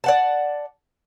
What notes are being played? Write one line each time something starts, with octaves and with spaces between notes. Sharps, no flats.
D5 F#5 A5